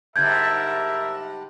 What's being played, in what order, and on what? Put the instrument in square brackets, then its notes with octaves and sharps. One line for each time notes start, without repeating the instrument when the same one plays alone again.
[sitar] G#2 D3 G3 [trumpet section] A#4 E5 [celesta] G6 G#6